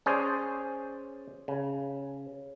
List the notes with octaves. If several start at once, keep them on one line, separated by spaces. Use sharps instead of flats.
C#4 G#4 C5 D5
C#3